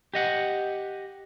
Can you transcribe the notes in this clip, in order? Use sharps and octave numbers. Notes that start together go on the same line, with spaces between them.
G4 D#5 F#5